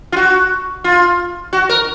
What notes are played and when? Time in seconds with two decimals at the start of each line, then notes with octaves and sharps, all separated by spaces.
0.12 F4
0.16 F#4
0.84 F4
1.53 F#4
1.69 A#4